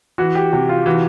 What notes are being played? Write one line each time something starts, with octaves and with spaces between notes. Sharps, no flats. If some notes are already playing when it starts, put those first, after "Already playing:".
E3 F#4
G4
C3 F#4
F4
E3 F#4